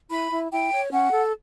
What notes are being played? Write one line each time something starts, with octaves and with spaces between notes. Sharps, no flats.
E4 B5
E4
E4 G5
C#5
C#4 F#5
A4